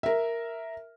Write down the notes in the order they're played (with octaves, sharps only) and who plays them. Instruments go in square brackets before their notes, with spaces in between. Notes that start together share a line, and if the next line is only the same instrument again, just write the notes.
[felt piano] A#4 E5